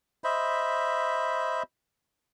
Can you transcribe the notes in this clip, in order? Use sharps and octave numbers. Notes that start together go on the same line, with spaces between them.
C5 D#5 E5 B5